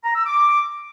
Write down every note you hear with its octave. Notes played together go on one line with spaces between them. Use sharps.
A#5
E6
D6